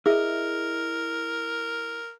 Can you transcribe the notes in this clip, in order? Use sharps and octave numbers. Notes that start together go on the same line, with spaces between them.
E4 G#4 A#4 D#5 E5